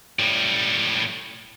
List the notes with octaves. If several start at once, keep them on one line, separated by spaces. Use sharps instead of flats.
A2 G3